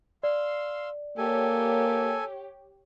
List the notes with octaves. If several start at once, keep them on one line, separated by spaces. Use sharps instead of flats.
D5 F5 C6 E6
A#3 G4 A4 C#5 G#5